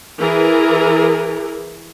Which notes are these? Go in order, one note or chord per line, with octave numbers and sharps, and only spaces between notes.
E3 G#4 A#4